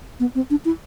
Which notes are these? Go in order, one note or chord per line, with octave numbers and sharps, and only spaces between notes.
B3
C4
D4
E4